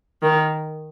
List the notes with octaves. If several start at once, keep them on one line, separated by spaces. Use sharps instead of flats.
D#3